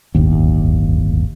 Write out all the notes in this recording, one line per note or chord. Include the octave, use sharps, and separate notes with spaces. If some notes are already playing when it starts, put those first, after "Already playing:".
D1 G1 D#2